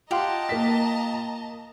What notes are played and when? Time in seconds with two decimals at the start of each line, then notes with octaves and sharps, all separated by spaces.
0.11 F4 G4 D#5 F5 F#5 A5 A#5 C6
0.49 A#3 B6